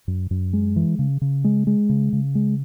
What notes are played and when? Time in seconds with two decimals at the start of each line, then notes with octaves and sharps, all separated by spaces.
0.08 F#2
0.31 F#2
0.53 G#3
0.76 E3
0.99 C#3
1.21 C#3
1.44 G#3
1.67 G#3
1.89 C#3
2.13 C#3
2.35 G#3